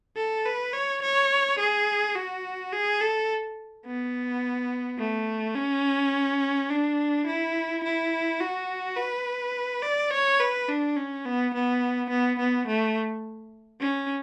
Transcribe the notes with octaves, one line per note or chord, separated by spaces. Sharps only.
A4
B4
C#5
C#5
G#4
F#4
G#4
A4
B3
A3
C#4
D4
E4
E4
F#4
B4
D5
C#5
B4
D4
C#4
B3
B3
B3
B3
A3
C#4